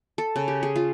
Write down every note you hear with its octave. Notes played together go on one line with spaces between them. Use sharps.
A4
C#3
G4
G#4
F4